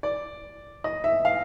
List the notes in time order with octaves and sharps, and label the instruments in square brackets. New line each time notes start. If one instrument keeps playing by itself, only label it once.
[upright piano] D5
D#5
E5
F5